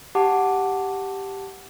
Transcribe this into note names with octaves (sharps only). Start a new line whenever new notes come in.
G4 F#5 A5 D6